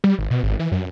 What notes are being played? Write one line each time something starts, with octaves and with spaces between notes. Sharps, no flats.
G3
G#1
B2
G#1
E3
F#2